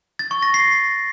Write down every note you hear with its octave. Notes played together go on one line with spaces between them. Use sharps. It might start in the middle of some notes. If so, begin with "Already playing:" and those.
A6
C#6
A#6
C7